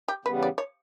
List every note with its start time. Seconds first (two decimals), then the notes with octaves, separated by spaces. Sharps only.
0.08 G4
0.25 E2 C#3 G3 B3 B4
0.43 D5
0.58 C#5